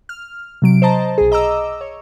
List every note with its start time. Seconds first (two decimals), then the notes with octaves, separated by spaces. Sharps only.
0.09 F6
0.62 C3 F#3 D7
0.82 C5 D#5 A5 A#5
1.18 B1 G#4
1.32 D#5 A#5 D6 E6
1.81 C#5